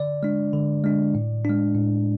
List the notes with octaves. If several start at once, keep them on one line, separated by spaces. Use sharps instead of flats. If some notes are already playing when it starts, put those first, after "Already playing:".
Already playing: D3 D5
G#3 D4
D3
G#3 D4
A2
G#3 D4
A2